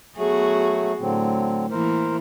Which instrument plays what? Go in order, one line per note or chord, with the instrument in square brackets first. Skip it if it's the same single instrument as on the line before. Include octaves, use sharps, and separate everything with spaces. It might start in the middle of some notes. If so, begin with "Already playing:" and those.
[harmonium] F#3 A3 [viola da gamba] B3 F#4 G#4
[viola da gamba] A2 [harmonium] D3 F#3 C4
[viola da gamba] E3 A#3 E4 [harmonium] A#4 C5